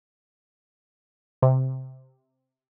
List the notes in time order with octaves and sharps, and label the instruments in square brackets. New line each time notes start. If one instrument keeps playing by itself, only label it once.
[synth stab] C3